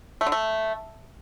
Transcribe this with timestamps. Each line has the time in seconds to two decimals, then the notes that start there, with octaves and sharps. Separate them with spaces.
0.21 A3
0.26 D3
0.32 A3